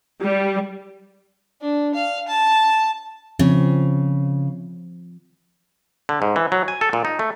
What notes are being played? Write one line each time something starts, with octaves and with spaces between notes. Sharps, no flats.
G3
D4
F5
A5
C#3 F3 C4
D3
G#2
E3
F#3
G#5
A4
A#2
D#4
A3